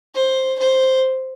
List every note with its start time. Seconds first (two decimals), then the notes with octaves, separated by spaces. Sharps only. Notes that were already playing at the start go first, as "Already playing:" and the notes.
0.15 C5
0.59 C5